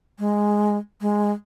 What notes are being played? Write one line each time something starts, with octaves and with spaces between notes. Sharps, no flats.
G#3
G#3